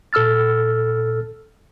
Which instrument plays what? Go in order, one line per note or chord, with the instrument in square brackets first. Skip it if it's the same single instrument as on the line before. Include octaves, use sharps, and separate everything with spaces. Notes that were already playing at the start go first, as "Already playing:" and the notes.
[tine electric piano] A#2 A4 E6 F6 A6